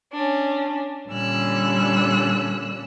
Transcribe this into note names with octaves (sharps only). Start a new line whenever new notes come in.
C#4 D4
A#2 D3 G3 C#4 E6 F#6